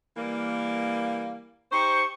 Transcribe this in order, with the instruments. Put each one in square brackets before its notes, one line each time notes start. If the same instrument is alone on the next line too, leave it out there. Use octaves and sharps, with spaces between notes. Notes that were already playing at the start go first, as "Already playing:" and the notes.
[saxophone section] E3 G3 A#3
[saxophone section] D#4 G4 C5 [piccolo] C#6